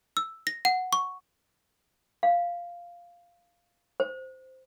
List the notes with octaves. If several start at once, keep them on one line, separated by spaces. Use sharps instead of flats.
E6
A#6
F#5
C#6
F5
C5